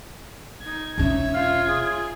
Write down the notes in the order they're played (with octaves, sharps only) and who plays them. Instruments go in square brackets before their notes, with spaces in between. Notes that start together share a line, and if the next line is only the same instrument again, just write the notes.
[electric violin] D#4 G#6
[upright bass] E1 C#4 [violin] C#5 E5
[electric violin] F4 G#6 [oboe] F5
[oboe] G#4